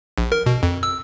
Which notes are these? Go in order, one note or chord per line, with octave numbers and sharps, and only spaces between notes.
A#1
A#4
B2
F2
E6